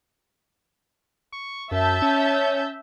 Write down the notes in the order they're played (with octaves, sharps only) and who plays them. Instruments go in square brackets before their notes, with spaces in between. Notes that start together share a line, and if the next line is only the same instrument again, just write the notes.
[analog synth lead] C#6
[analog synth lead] F#2 [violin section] E5 A5 G6
[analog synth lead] C#4